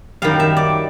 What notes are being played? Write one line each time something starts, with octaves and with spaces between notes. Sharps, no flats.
F#2 D#3 G3 F5
E5
D5